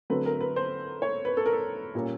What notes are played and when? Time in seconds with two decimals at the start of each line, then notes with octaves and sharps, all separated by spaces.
0.10 D3 F#3 A3 C4 B4
0.26 A#4
0.41 B4
0.56 C5
1.02 C#5
1.25 B4
1.37 A4
1.46 A#4
1.53 A4
1.95 A#2 G3 A#3 C#4